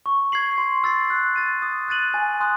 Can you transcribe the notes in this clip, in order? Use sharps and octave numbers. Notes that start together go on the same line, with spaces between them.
C#6
G#6 C7 F#7
C6
E6 A6 C7
F#6
A6 D#7
D#6
F#6 A6 D#7 F#7
G#5
C6 D#6 F#6